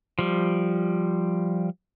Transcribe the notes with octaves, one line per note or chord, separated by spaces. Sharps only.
F3 G3